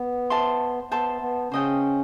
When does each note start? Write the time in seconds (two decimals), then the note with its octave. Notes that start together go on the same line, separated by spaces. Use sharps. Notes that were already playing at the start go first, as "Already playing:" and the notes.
Already playing: B3
0.30 C5 E5 A5 C6
0.91 B3 C5 E5 A5 C6
1.22 B3
1.52 C#3 C#4 C5 D#5 G5